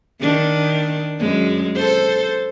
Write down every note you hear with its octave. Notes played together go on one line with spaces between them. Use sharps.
D#3 D4
F#2 G#3
A4 C5